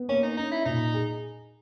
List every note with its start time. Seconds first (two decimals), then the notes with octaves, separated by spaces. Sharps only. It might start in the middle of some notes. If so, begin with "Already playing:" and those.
Already playing: B3
0.09 A#3 C#4
0.23 D#4
0.37 C#4 D#4
0.51 E4
0.65 A#2 D#4
0.94 G#4